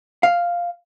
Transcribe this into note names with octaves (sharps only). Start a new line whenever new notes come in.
F5